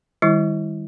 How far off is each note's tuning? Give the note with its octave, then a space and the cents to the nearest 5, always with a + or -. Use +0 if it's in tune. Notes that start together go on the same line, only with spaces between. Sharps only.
D#3 +0 G3 +30 E4 +0